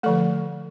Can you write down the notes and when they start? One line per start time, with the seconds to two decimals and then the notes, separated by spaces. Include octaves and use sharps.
0.03 D3 F3 A3 A4